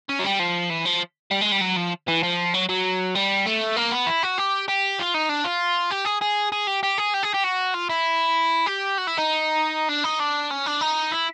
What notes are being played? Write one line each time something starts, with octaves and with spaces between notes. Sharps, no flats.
C#4
F#3
G3
F3
E3
F3
G3
G#3
G3
F#3
F3
E3
F3
F#3
F#3
G3
A3
A#3
B3
E4
F#4
G4
G4
F4
D#4
D4
F4
G4
G#4
G#4
G#4
G4
G4
G#4
G4
G#4
G4
F#4
F4
E4
G4
F#4
E4
D#4
D4
D#4
D4
C#4
D4
D#4
E4